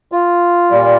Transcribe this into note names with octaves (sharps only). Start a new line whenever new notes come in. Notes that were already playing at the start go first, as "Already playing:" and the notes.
F4
A#2 G3